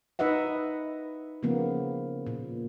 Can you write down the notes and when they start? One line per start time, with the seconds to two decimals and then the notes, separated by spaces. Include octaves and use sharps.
0.19 D#4 B4 D#5 E5 F#5
1.43 C#3 F3 A#3 B3
2.27 A#2